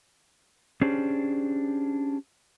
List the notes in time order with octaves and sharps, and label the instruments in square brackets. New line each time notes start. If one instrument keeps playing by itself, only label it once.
[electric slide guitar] C#4 D4 G4 G#4 C5